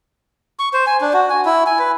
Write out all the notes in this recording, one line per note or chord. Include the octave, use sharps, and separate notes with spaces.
C#6
C5
G#5
D4
F#4
G#5
E4
G#5
B4